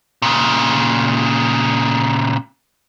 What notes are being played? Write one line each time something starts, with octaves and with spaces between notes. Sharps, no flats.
A#2 C#3